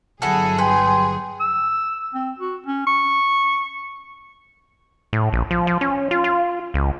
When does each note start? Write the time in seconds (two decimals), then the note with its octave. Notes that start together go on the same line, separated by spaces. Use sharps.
0.22 G1 F#3 E4 F#4 G#4 A4
0.58 B4 G5 G#5 C6
1.40 E6
2.15 C4
2.39 F#4
2.66 C#4
2.87 C#6
5.13 A2
5.33 A#1
5.51 F3
5.67 F3
5.81 C#4
6.11 F4
6.24 F4
6.74 C#2